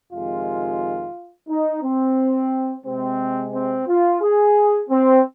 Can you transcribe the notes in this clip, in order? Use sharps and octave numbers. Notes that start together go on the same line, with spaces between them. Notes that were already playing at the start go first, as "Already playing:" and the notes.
F2 C3 D#3 G#3 F4
D#4
C4
C3 G#3 C4
C4
F4
G#4
C4